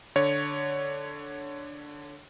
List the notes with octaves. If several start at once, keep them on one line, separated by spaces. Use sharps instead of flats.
D3 C#5